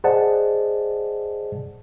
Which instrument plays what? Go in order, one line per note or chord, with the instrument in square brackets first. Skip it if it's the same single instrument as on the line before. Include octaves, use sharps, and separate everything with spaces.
[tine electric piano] G#4 C5 D5 D#5 F#5 A5